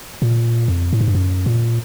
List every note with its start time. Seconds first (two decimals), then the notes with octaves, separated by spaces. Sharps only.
0.22 A#2
0.68 F2
0.93 A2
1.00 G#2
1.08 G2
1.15 F#2
1.46 A#2